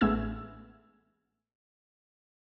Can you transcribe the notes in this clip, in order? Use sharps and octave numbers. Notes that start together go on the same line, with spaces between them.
A1 G#3 A3 B3 E6 G#6